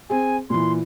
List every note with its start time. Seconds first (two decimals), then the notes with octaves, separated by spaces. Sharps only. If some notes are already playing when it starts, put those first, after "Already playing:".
0.10 C4 G#4 G#5
0.50 A#2 E3 C6